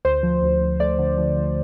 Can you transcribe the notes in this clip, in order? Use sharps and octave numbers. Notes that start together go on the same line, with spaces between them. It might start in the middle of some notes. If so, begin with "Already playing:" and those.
D2 C5
F3
D2
D2
A3 D5
D3
F3
F3